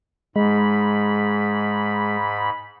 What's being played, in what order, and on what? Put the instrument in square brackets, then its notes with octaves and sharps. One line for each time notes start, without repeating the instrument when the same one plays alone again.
[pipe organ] G#2 B5 [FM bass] G#3